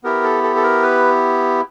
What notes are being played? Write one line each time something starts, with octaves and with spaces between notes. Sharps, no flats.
B3 E4 G4 A#4
A4
A4
A4
A#4
B4